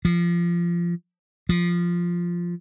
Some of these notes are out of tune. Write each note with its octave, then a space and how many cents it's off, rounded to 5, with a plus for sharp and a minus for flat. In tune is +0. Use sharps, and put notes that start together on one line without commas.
F3 -20
F3 -5